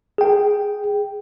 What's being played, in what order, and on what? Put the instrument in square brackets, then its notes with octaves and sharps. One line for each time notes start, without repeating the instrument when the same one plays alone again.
[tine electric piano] G#4 G5